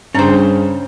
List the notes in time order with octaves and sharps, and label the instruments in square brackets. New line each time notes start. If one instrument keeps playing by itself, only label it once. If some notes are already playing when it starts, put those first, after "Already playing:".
[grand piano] G2 C#3 [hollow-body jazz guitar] C#4 C5 [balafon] D4 A#5